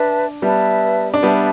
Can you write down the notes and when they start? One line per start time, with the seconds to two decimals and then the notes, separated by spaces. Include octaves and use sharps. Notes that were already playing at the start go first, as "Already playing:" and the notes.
Already playing: D4 B4 E5 A5
0.42 G3 B3 B4 E5 A5
1.14 D4
1.23 G3 B3 B4 E5 A5